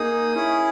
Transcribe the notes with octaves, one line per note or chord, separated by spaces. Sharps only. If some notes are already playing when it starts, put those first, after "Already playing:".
Already playing: A#3 D#4 G#4 D#6
C#4 E4 G#4